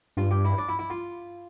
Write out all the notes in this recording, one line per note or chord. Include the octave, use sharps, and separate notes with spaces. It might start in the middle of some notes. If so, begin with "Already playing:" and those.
G2 F4
G4
E4
D4
E4
E4
F4